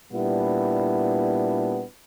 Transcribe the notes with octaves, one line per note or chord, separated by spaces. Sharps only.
A#2 G3 B3 D4 E4